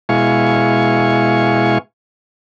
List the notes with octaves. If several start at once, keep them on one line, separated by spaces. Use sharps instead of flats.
B2 G#3 E4 F5 G#5 C#6